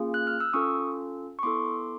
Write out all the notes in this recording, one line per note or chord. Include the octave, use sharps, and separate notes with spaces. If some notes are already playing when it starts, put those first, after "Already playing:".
Already playing: A#3 C#4 F4 G#4
F#6
F6
E6
C#4 F4 A4 C#6 D#6
C#6
B3 E4 A4 C6 D6